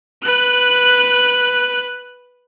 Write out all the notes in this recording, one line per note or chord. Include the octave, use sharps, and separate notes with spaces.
B4 F#6